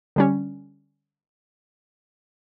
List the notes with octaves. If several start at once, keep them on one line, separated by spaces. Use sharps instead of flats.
D3 G3 C#4